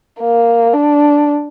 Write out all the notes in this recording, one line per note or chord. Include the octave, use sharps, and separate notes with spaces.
A#3
D4